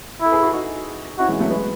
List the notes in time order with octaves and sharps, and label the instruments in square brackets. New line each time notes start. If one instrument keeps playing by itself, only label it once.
[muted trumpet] E4 [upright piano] A4
[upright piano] G#4 B4
F#4 A4
D#4 F#4
[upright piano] C#4 E4 [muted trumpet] F#4
[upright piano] E3 G#3
F#3 A3
G#3 B3